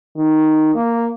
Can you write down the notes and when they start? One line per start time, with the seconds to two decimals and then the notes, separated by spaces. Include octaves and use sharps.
0.17 D#3
0.75 A#3